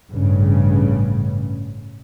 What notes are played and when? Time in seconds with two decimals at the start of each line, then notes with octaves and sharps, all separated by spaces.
0.10 A1 G2 C#3